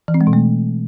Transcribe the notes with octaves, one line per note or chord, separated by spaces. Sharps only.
E3
C4
G#3
B2
A3